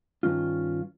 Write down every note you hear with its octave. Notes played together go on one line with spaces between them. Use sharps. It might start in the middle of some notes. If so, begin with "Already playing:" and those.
G2 D#3 C#4 F4